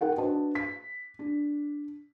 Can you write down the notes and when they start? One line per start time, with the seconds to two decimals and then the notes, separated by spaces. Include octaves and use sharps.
0.01 D#4 A#4 F#5 G5
0.18 D4 F#4 B4 C5 D#5 A5
0.55 B6
1.19 D4